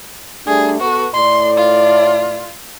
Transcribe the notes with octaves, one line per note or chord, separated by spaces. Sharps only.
G3 A3 D4 G#4
B3 F#4 A4 B4
A2 D5 C6
F4